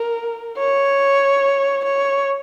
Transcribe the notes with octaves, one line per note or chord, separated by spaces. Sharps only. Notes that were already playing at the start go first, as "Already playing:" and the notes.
Already playing: A#4
C#5
C#5